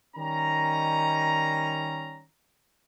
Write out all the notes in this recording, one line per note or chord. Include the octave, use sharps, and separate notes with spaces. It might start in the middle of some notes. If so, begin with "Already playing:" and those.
D#3 G3 C#4 A#5